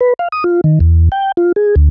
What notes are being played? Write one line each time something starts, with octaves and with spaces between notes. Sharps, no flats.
B4
F5
D#6
F4
D#3
E2
G5
F4
G#4
D2